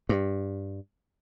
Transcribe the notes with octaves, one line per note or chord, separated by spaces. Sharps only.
G2